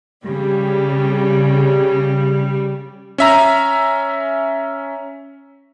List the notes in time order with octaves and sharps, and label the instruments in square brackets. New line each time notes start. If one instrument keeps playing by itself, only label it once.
[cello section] C#3 [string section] G3
[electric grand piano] C#4 E5 A#5